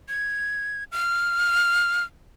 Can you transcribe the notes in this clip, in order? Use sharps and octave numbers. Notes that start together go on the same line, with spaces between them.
G#6
F6